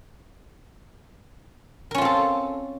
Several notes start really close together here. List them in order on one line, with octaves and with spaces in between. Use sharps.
A#4 C#4 F4 C4 A4